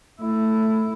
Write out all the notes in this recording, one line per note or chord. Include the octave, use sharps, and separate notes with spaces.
A3 E4